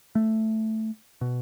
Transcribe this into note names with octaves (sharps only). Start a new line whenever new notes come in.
A3
B2